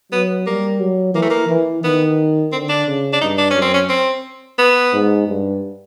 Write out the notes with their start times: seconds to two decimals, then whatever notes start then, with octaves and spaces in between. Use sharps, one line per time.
0.12 F#3 B3
0.46 G3 A#3
0.80 F#3
1.14 E3 A#3
1.22 A3
1.30 A#3
1.49 E3
1.84 D#3 B3
2.51 D3 C4
2.69 D4
2.87 C#3
3.13 D4
3.21 G2 D#4
3.38 D4
3.50 F#2 C#4
3.62 C4
3.74 C#4
3.89 C4
4.59 B3
4.93 G#2
5.27 G2